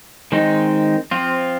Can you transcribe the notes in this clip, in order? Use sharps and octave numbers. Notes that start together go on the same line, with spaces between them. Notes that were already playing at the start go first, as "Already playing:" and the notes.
D#3 G#3 C4 D#4
F3 C4 F4